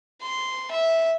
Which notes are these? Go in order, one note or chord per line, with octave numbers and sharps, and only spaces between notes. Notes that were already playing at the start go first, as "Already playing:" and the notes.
C6
E5